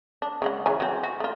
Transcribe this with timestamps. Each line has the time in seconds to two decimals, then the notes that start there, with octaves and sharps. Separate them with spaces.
0.22 D4
0.42 C#3 G#3 F#5
0.66 C#3 E3 G#5
0.80 F#3 C4
1.03 F#4
1.20 A3 F4